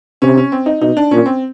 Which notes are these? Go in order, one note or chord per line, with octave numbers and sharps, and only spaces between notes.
C3 C#4
C#4
C4
D#4
B2 D#4
D4
A#2 C#4
C4